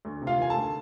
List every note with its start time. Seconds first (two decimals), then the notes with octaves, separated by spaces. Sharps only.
0.05 D2
0.22 C3
0.27 F4 F5
0.39 D#3 G#5
0.50 A4 A5
0.56 D2